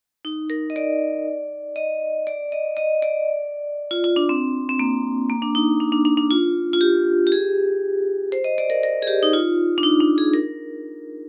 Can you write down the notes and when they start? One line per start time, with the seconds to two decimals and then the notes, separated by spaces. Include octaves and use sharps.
0.25 D#4
0.50 A#4
0.70 D#5
0.76 D5
1.76 D#5
2.27 D5
2.52 D#5
2.77 D#5
3.02 D5
3.91 F4
4.04 F4
4.16 D4
4.29 C4
4.69 C4
4.79 A#3
5.30 A#3
5.42 D4
5.55 D#4
5.80 D4
5.92 D4
6.05 D4
6.17 D4
6.31 F4
6.73 F4
6.81 G4
7.27 G4
7.32 G#4
8.32 C5
8.44 D#5
8.58 D5
8.70 A#4
8.83 A#4
9.02 G#4
9.07 G4
9.23 D#4
9.33 F4
9.78 D4
9.83 D#4
10.00 D4
10.18 G#4
10.34 A#4